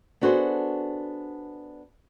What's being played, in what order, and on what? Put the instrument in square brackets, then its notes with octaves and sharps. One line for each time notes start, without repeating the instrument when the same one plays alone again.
[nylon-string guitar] B3 D4 F#4 G#4 A4 C5